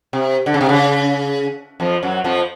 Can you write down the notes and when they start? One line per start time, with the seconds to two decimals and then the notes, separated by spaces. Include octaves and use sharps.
0.13 C3
0.46 D3
0.54 C#3
0.61 C3
0.69 C#3
1.80 F2 F3
2.03 F#2 F#3
2.24 F2 F3